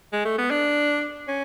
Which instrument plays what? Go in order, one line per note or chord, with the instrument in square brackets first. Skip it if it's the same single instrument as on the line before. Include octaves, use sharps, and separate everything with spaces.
[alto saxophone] G#3
A3
B3
D4
C#4